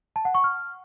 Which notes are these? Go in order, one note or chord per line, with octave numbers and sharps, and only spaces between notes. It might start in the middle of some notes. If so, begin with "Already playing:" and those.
A5
F#5
C#6
F6